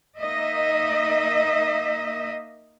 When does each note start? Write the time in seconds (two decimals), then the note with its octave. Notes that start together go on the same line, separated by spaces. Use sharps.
0.17 A#3 D#4 D#5 E5